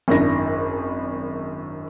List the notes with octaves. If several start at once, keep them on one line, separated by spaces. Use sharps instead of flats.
G#1 F#2 D4 E4 A#6